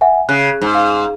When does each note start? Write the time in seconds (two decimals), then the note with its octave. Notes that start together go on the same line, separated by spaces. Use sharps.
0.01 E5 F#5 G#5
0.29 C#3 F#6
0.61 G#2
0.75 F5